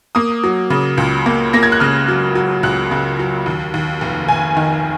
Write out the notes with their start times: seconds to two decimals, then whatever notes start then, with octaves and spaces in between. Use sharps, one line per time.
0.15 A#3 D#6
0.44 F#3
0.70 C#3
0.97 C#2
1.26 A#3
1.53 A#3 A#6
1.63 G#6
1.72 F#6
1.80 C#3 F6
2.08 F#3
2.35 F#3
2.63 C#2 F#6
2.91 C#3
3.19 F#3
3.46 D#2
3.74 D#2
4.01 F1
4.28 F1 G#5
4.57 D#3